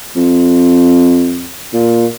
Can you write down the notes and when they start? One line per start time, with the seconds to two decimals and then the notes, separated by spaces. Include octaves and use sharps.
0.16 F2
1.73 A#2